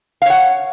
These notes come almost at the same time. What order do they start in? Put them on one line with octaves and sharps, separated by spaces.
F5 C#5 F#5